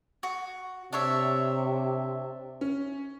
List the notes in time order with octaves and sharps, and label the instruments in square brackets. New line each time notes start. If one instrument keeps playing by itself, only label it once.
[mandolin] F#4
[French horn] C3 [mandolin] D4 C#5 E5
[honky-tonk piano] C#4